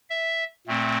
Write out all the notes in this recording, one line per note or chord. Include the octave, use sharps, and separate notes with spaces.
E5
A#2 A3 C4